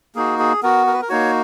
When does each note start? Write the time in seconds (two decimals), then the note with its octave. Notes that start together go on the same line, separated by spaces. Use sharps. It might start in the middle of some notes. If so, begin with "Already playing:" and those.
0.15 A#3 D#4 F#4 G#4
0.39 G#4
0.63 B3 F#4 A#4
0.87 A#4
0.93 B4
1.02 A#4
1.09 A#3 D#4 F#4 C#5